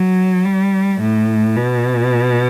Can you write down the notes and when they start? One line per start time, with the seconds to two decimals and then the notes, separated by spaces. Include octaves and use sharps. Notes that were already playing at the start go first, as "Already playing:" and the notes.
Already playing: F#3
0.45 G3
1.01 A2
1.56 B2